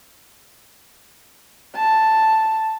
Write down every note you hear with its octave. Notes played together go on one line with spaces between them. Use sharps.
A5